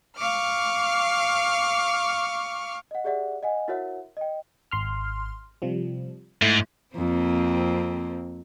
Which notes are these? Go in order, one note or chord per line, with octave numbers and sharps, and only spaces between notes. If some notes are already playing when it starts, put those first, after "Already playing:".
F5 C#6 D6 F6
D#5 F#5
G4 G#4 D5 E5 F#5
D#5 F#5 G#5
E4 F#4 A#4 C#5 E5 F#5
D#5 G5
G#1 C6 F6
C3 F3 G3
G#2 A3 E4
F2 A#3 C4